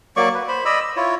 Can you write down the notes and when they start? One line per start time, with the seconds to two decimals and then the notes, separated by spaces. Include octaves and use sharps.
0.17 F#3 A#3 D5 C#6
0.35 B4
0.48 C5 B5
0.65 D5 D#5 B5 E6
0.81 E6
0.96 E4 F4 C#5